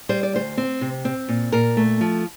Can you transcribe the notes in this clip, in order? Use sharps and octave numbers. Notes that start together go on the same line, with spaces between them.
G3 C5
D5
D2 C5
C4
C3
C4
A#2
A#2 A#4
A3
F3